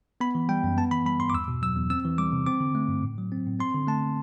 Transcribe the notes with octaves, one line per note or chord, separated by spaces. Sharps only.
B3 B5
E3
G3 G5
F#2
B3 A5
E3 B5
G3 B5
G2 C6
D6
E2 E6
B2
F#3 E6
E2
C4 E6
E3
G3 D6
C3
C4 D6
D3
A3
G2
A2
F#3
C4
A2
C4 C6
D3
A3 A5